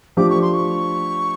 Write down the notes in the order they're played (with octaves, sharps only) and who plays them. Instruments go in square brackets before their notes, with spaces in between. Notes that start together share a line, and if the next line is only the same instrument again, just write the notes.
[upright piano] F3 A3 D4 G4 [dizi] D6
[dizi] C#6
C6
C#6